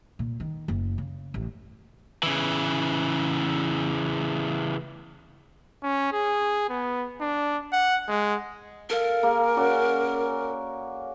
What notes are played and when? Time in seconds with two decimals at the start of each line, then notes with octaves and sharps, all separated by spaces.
0.19 A#2
0.40 D#3
0.68 F#1
0.98 C#3
1.34 A1
2.23 C#3 E3
5.83 C#4
6.13 G#4
6.69 B3
7.21 D4
7.73 F#5
8.08 G#3
8.90 A4 A#4 F5
9.23 A#3 G#4
9.57 C#4 F#4 D5